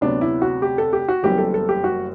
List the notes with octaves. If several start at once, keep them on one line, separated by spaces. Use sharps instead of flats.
D2 C3 F#3 B3 D4
E4
F#4
G4
A4
G4
F#4
F#1 F#2 E3 G3 B3 G4
A4
A4
G4
F#4